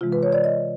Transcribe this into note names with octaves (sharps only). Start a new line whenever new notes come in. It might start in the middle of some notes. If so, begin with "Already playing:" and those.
C3 E3 G#3 F4
B4
C#5
D5
D#5